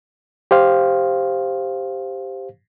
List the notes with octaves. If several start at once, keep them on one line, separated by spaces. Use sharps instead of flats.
G4 C5 F5